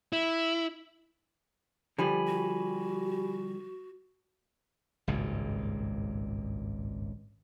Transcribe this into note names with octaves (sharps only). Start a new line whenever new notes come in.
E4
D3 F3 G3 G4 G#5 B5
F#4
G#1 C#2 G2 A#2